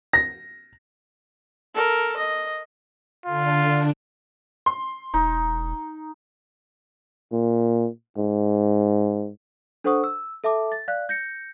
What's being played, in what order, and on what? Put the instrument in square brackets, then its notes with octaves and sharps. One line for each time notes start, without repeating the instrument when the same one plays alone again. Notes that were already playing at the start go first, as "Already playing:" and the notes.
[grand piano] A#6
[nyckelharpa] A4 A#4
D#5
[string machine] D3 D4 [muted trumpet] F4
[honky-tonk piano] C6
[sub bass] E1 [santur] D#4
[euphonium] A#2
G#2
[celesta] D4 A4 C5 F#5 C#6 D#6
E6
A4 E5 A5 D6
A6
D5 F5 F#6
G6 A#6 C#7